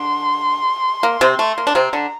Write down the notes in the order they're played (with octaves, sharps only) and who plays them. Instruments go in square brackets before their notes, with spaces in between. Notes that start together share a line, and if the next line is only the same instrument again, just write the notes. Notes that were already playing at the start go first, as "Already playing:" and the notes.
Already playing: [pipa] D3 D4 [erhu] C6
[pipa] A#3
C3 C4
A3
A#3
D4
[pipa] C3 C4 [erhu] A#5
[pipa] D3 D4